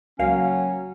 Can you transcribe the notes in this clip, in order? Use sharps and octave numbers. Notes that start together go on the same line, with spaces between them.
C#2 F#3 A#3 C#4 F5